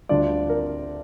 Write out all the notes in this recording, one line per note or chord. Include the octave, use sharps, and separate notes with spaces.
D2 D3 G3 D4 F4 D5
A#4